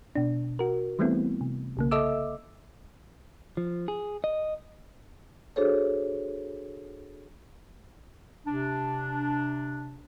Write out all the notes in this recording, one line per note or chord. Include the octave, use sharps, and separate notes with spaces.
B2 D4
F#4 A#4
E3 G3 A3 B3 C4 E4
C3
B1 C#3 A#3
A4 D#5 E5 D6 E6
F3
G#4
D#5
D4 F#4 G#4 A4 C5 C#5
C3 D4